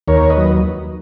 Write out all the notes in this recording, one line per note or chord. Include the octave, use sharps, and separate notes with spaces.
D#2 A#4 C#5
B4 D#5
F#3